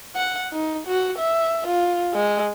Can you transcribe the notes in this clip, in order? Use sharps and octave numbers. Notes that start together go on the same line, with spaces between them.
F#5
D#4
F#4
E5
F4
G#3